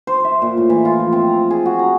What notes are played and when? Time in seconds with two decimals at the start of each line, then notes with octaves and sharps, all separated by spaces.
0.07 C5
0.24 E5
0.42 A#2
0.57 A2
0.70 E3
0.85 F4
1.00 F3
1.13 C4
1.27 A#5
1.51 G#4
1.66 F#4
1.79 A#5